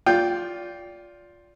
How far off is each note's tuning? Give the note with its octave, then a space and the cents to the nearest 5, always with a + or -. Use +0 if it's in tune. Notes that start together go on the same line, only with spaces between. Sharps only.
F4 +10 D5 -25 G5 +0